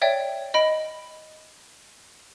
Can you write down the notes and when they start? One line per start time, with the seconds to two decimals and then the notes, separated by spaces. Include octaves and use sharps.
0.02 C#5 D5 E5 G5
0.54 D#5 B5 D7